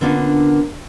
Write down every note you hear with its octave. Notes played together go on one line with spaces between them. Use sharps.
D3 A#3 B3 C#4 D4 F4